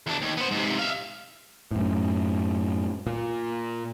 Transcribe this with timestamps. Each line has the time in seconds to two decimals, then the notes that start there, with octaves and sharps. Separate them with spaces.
0.07 E2 D4
0.22 D#2
0.38 B3 C5
0.52 G#2 C3
0.79 E5 F5
1.71 F#2 A2
3.07 A#2